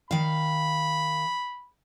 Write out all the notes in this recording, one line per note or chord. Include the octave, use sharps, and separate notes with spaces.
D#3 F5 B5